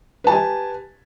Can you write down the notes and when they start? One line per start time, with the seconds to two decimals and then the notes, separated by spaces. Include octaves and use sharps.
0.24 B4
0.27 A5
0.29 G4
0.32 G#5